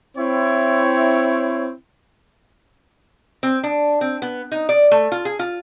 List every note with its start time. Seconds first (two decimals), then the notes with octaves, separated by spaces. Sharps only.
0.18 C4 E4 C#5
3.43 C4
3.64 D4
4.01 C4
4.22 B3
4.52 D#4
4.69 D5
4.92 A3
5.12 F4
5.25 G#4
5.39 F4